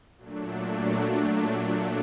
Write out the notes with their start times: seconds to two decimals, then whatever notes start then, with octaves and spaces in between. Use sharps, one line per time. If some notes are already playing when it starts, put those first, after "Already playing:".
0.17 A#2 F#3 A3 D4